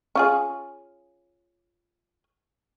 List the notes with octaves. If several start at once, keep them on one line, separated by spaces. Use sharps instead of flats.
C#4 F4 G#4